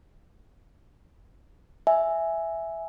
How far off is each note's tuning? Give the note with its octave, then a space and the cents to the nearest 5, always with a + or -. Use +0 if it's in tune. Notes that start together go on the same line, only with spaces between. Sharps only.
E5 +0 G#5 +0